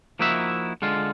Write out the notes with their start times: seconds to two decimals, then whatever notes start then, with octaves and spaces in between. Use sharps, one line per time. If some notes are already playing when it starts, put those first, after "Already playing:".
0.19 F3 A#3 D#4 E4 F#4 E5
0.82 D3 G#3 F4